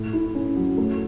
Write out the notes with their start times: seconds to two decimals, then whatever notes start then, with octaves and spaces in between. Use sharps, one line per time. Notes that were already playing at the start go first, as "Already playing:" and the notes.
Already playing: A2
0.13 E4
0.35 C#4
0.56 F#3
0.78 A3